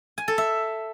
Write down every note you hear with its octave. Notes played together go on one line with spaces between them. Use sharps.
G#5
A4
E5